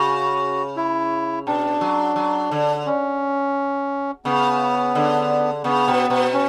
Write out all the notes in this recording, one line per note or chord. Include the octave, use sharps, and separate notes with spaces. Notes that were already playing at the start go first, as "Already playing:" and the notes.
Already playing: C#3 F#4
E4
B2 D4
F#3
F#3
D3
C#4
C#3 B3
D3
C#3 B3
B2
B2
C#4